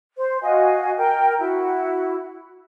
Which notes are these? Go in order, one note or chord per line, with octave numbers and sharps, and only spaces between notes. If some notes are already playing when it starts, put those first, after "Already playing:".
C5
F#4 D#5 F5 G#5
A#4 G5
E4 F#4